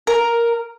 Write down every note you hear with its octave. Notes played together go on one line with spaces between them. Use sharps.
A#4